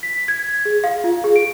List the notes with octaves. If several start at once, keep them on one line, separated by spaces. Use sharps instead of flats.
B6
G#6
G#4
F5
F4
G#4
D7